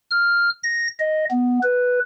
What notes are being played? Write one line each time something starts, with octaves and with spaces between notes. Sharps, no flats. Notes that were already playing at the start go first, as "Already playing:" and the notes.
F6
A#6
D#5
B3
B4